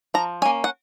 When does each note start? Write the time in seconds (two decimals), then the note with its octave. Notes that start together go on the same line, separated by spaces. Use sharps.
0.14 F3 A#5
0.42 C#4 G#5
0.45 A#3
0.64 F#5